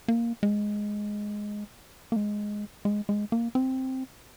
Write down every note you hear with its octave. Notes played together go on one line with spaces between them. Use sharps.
A#3
G#3
A#3
G#3
G#3
G#3
A#3
C4